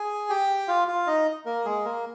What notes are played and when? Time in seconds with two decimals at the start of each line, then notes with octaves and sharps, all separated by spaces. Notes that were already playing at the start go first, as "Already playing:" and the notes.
Already playing: G#4 G#5
0.30 G4 G5
0.68 F4 F5
0.88 F4 F5
1.07 D#4 D#5
1.46 A#3 A#4
1.65 G#3 G#4
1.85 A#3 A#4